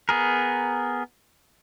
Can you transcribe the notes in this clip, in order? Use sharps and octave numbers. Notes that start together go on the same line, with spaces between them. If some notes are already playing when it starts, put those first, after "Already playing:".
B3 G#4 A#4